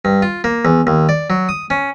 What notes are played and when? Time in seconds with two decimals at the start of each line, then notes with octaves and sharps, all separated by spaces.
0.05 G2
0.22 F4
0.44 A#3
0.65 E2
0.87 D#2
1.09 D5
1.30 F#3
1.49 D#6
1.70 C#4